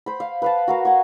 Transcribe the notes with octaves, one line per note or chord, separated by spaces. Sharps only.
C5 B5
F5
B4 F5 A5
F#4 A#4 F5
F#5 G#5 C#6